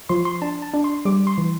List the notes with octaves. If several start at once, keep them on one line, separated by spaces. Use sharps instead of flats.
F3 C6
C6
D4 A5
A5
D4
C6
G3 D6
C6
E3